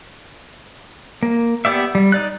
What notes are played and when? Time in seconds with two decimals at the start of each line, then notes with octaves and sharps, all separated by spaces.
1.23 A#3
1.65 B3 G4 D5 E5
1.95 G3
2.12 D#4 D5 F#6